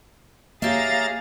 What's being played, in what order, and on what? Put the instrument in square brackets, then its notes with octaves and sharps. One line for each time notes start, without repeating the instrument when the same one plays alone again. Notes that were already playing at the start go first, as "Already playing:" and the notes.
[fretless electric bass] A#3 [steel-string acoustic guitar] G4 C#5 E5 [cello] G#4 F5 [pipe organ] A#5 A6